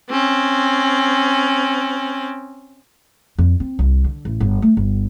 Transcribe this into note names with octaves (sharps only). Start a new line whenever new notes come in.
C4 C#4
F2
C4
C2
D3
A1
G1
A3
G1